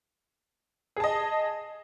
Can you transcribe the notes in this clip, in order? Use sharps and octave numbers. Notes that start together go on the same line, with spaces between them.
G#4 D#5 A5